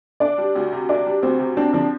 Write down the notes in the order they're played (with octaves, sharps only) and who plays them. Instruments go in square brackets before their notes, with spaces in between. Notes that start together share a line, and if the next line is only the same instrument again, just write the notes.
[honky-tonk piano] D4 [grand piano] D5
[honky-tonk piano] G3
D2
C3
[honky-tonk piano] D4 [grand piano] D5
[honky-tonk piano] G3
[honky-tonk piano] D2 [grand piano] C4
[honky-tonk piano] C3
[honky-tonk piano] C4 [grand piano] D4
[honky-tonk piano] F3 [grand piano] D4